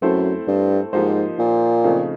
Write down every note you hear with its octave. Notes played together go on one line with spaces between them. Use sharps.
F#2 A3 C4 E4 A4 C5
G2
G#2 F3 A#3 D#4 G4 C5
A#2
C#3 F3 A3 C4 D#4